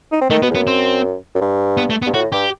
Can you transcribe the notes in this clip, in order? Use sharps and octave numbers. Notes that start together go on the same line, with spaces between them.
D#4
C4
D#3 A3
B2 B3
E2
F#2 B3
C4
F#2
G2
B3
A3
B3
G2
A2 F#4
G2 G4